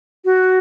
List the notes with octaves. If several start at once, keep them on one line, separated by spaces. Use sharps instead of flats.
F#4